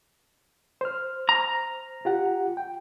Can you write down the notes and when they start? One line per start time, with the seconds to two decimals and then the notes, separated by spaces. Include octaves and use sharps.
0.81 C5 F6
1.29 A#5
2.05 F4 G4 F#5
2.57 G5